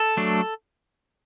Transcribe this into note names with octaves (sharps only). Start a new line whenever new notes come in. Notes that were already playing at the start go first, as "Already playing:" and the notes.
Already playing: A4
F#3 A3 D4